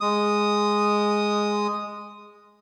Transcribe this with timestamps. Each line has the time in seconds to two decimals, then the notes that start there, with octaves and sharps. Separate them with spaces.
0.01 G#3 D#6